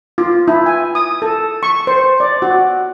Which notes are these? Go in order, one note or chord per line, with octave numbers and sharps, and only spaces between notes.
F4
E4
G#5
D#6
A4
C#6
C5
D5
F#4